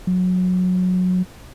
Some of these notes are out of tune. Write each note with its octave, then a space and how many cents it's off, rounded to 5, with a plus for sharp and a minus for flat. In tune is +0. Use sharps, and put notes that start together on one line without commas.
F#3 -20